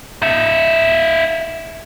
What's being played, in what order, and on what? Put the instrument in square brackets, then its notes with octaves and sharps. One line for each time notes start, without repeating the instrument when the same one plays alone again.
[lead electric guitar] D#4 E5